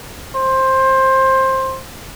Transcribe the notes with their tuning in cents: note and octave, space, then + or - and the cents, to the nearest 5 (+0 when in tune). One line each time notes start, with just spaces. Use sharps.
C5 +15